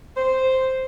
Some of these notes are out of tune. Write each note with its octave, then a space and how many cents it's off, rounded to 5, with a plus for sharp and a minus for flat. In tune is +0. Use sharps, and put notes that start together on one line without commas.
C5 -5